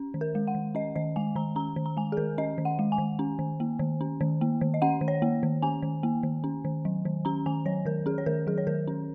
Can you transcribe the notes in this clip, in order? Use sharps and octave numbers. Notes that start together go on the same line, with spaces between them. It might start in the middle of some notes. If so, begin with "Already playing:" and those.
Already playing: C#4
D#3
A#4
G#3
F#5
D#3
C#4 D#5
D#3 D#5
G#3 G#5
D#3 A#5
C#4 A#5
D#3
A#5
G#3 G#5
G#4
D#3 A#4
C#4 D#5
D#3
F#5
G#3
G#5
D#3
C#4
D#3
A#3
D#3
C#4
D#3
A#3
D#3
D#5
C#4 F#5
D#3
C#5
A#3
D#3
C#4 G#5
D#3
A#3
D#3
C#4
D#3
F#3
D#3
C#4 A#5
D#3 G#5
F#3 C#5
D#3 A#4
C#4 G#4
C#5
D#3 A#4
F#3 G#4
C#5
D#3 A#4
C#4